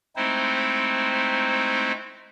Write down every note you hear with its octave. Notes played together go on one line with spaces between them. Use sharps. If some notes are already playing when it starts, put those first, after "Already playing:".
G#3 A3 C4 D#4 E4 C5